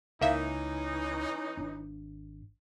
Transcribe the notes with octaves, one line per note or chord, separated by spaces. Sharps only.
C#2 E3 A#3 C#4 D#4 E5
G#1 D4